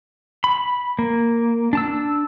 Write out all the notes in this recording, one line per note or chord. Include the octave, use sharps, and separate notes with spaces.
B5
A#3
D4 A5 E6